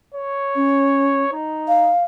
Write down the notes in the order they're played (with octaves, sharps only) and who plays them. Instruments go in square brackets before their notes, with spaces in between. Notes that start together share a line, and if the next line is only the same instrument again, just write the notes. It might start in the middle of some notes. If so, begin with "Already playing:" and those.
[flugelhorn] C#5
[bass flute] C#4
[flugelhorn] D#4
[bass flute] F5